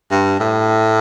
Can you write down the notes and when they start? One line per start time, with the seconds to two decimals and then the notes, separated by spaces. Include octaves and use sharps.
0.11 G2
0.40 A2